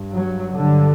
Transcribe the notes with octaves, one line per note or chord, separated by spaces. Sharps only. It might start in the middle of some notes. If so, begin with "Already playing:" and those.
Already playing: G2
F#3
G2 D3